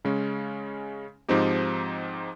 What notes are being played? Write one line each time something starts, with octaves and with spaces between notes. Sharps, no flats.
C#3 G#3 C#4
G#2 F3 C4 D#4 G4